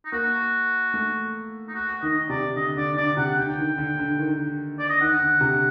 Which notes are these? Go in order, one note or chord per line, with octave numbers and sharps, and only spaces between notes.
D#4
A#3 F#4
A3
D#4
F#4
D#3 D#5
C3 D5
D3 D#5
D3 D5
D3 D5
C3 F#5
D3 G5
D#3
D3
D3
D#3
D5
D#5
D#3 F#5
D3
C3